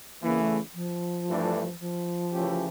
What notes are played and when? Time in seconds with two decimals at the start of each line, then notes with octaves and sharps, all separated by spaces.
0.22 E2 C#3 E3 A#3
0.40 A3
0.74 F3
1.28 G2 E3 A3 D4
1.80 F3
2.32 C#3 E3 A3 C#4 G4